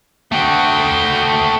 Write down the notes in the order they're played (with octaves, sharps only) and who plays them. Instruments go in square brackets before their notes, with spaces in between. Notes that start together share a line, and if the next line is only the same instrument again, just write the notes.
[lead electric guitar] A3 F#4 [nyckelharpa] G5